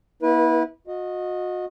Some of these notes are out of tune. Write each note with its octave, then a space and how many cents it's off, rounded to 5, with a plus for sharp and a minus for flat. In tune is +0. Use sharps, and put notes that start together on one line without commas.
B3 -45 E4 -25 B4 -20
F#4 -35 D#5 +0